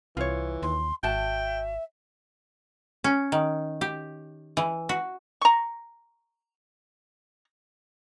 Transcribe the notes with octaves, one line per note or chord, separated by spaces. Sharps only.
C2 E3 F4 C#5
D#2 C6
G#1 F#4 E5 G5 A5
C#4
D#3
G4
E3
F#4
A#5 C#6